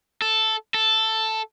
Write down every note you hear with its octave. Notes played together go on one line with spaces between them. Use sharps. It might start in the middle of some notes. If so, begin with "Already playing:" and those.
A4
A4